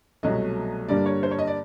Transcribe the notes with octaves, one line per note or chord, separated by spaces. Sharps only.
C2 B2 F#3 A3 D#5
G2 D3 G3 A#3 D5
C#5
C5
C#5
D#5
D5